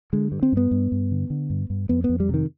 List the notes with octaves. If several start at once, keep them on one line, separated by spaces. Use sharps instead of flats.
D3 G#3
G2
C4
G2 B3
G2
G2
D3
D3
G2
G2
F2 B3
B3
F2
G3
C3 D#3